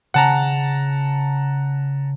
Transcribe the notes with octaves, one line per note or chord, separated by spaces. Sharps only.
C#3 F#5 A5 A#5